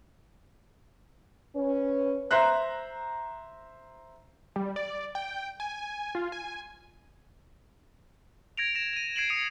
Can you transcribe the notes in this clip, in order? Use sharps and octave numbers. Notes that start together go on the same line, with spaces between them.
C#4 B4
C5 E5 A#5 F#6
G3
D5
G5
G#5
F4
G#5
G#6 A#6 D7 F7
A#6 E7
D#7 F7
G#6 C7 D7 E7 F#7
D#6 C7 C#7 D#7 F7